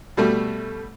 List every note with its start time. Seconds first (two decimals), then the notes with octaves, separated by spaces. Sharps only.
0.17 B2 G3 A3